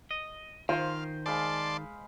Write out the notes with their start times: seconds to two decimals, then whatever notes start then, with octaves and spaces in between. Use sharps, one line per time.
0.11 D#5
0.69 D#3 F4 C5 F5 C6
1.26 G#3 D5 F5 A5 B5 C6